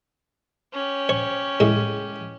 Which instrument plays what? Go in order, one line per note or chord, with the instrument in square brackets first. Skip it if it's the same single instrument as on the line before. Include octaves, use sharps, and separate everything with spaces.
[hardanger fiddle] C#4 G4
[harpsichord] C#5
A2 G#3